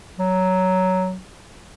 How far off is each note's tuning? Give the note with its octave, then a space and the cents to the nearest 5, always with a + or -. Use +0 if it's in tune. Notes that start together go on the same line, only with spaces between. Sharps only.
F#3 +10